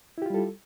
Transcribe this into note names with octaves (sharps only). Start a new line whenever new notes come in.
G3 E4 F4 G4 A4